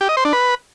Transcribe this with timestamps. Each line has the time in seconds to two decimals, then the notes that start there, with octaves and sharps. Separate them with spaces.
0.01 G4
0.09 D#5
0.17 C5
0.25 D4
0.33 B4